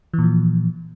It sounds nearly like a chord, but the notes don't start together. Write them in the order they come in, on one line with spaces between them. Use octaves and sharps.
E3 A#2 F3